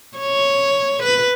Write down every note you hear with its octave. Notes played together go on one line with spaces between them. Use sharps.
C#5
B4